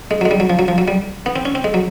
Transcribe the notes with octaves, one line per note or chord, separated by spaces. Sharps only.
G#3
F#3
G#3
G3
F#3
F3
F#3
F3
F#3
G3
B3
C4
C#4
C4
G#3
F#3